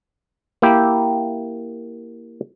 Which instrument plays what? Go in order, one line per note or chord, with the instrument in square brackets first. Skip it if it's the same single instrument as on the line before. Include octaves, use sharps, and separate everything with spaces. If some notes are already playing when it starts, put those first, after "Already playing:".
[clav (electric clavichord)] A#3 E4 G4